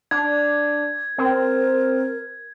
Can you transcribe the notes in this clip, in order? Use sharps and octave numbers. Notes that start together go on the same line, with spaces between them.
D4 G#6
C4 A#4